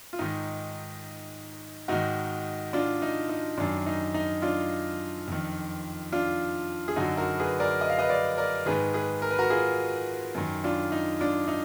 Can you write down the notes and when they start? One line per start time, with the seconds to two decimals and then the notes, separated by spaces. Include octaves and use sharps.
0.13 F4
0.19 G#2 D#3 D#4
1.88 G#2 D#3 D#4 F#4
2.73 D4 F4
3.02 D#4
3.29 D#4
3.58 F#2 D#3 D4
3.86 D#4
4.14 D#4
4.42 D4 F4
5.28 F2 D#3
6.12 D4 F4
6.88 G#4
6.96 F#2 D3 D#4 F#4
7.17 F#4 A#4
7.39 G#4 B4
7.60 A#4 D5
7.81 D#5
7.90 F5
7.99 B4 D#5
8.09 D5 F5
8.37 A#4 D5
8.66 G#2 D#3 G#4 B4
8.94 G#4 B4
9.22 A#4
9.31 B4
9.39 F#4 A#4
9.50 F4 G#4
10.35 F#2 D#3
10.64 D4 F4
10.92 D#4
11.20 D4 F4
11.48 D#4